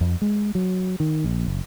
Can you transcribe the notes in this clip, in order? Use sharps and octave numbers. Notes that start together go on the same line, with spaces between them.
F2
G#3
F#3
D#3
A#1
F#1